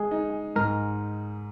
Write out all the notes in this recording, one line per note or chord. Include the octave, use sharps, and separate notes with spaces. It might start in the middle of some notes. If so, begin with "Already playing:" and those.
Already playing: G#3 G#4
D#4
G#2 A#4